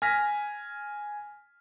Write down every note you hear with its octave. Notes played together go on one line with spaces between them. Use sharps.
G#5 F6 A#6 B6